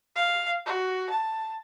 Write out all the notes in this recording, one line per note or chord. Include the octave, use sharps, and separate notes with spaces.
F5
F#4
A5